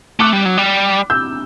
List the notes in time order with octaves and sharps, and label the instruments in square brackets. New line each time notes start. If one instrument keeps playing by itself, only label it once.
[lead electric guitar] A3 [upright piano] D6 F#6
[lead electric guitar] G3
F#3
G3
[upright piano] E6 G6